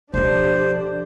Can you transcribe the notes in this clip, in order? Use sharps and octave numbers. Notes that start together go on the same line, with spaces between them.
B2 D3 F3 D4 D#4 G4 C5